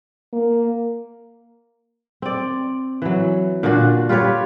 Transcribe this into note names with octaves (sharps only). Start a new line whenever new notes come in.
A#3
C4 D5
E3 F#3
A#2 D3 D4 F#4
F4 G4 B4 C#5